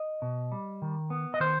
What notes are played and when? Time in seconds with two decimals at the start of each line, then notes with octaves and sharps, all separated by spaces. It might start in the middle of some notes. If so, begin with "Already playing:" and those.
Already playing: D#5
0.22 B2
0.52 G3
0.82 D#3
1.10 B3
1.34 D#5
1.40 D#3 C5